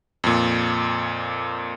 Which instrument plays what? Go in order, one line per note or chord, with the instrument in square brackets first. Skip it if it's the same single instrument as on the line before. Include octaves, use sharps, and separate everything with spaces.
[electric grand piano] F2 A#2